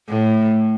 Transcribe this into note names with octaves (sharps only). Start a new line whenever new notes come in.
A2